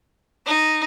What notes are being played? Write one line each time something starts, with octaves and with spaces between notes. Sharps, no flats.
D#4